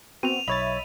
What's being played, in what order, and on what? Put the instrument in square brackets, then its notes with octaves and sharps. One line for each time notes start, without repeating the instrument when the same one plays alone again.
[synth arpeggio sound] B3 C4 F#4 [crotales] D#7 F7
[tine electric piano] B1 C#5 A6 [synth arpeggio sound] D#5 E5 B5